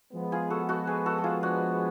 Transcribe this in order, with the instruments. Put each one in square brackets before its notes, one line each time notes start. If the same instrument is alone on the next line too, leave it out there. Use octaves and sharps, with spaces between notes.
[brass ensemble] F3 G#3 B3
[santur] F4 G#4
F#4 A4
F#4 A4
G#4 B4
F#4 A4
A4
F4 G#4
D4 F#4